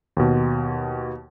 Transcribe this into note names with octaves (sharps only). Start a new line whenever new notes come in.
D#2 B2